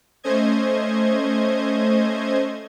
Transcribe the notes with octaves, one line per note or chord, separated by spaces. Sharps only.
A3 C#4 C5 D#5 G#6